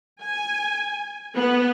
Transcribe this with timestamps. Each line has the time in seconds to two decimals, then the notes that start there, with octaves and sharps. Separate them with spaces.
0.24 G#5
1.36 B3